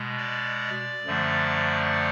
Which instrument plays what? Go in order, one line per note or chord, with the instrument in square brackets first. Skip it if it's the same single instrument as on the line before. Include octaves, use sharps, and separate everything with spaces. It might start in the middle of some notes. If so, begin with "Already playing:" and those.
Already playing: [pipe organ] B2 G#3
D5
F#2 D3 F3 A3